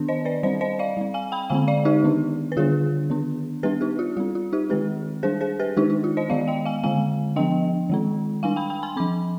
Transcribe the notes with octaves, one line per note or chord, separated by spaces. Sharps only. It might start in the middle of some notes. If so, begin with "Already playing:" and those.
Already playing: D#3 B3 D4
C5 D#5
B4 D5
G3 C4 C5 D#5
C5 D#5
D5 F5
G3 C4
F5 G#5
G5 B5
D3 G#3 C4 F5 G#5
D5 F5
D#4 G4
D#3 B3 D4
B4
D3 G3 D4 F4 G#4
D#3 B3 D4
G3 B3 D4 G4 B4
D#4 G4
F4
G3 C4 F4
F4
D#4 G4
D#3 G#3 C4 G4 B4
G3 D4 G#4 C5
G#4 C5
G4 B4
D#3 G#3 D4 D#4 G4
D#4
F4
C5 D#5
D#3 G#3 B3 D5 F5
D#5 G5
F5 G#5
D3 G#3 C4 F5 G#5
F3 B3 D4 D#5 G5
D#3 G#3 C4
G3 D4 F5 G#5
G5 B5
G5 B5
G#5 C6
F3 C4 B5 D6